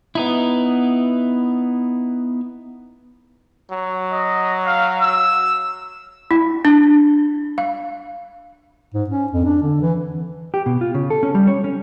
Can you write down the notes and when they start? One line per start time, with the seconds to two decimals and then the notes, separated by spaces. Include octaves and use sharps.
0.15 B3 D#4 E4
3.71 F#3
4.12 D#5
4.66 F5
5.01 E6
6.31 E4
6.65 D4
7.58 F5
8.94 G#2
9.09 C#4
9.32 F2
9.45 D4
9.62 D3
9.82 E3
10.54 G4
10.66 B2
10.81 F4
10.94 C#3
11.10 A4
11.23 C#4
11.35 G3
11.47 C#5
11.64 C#4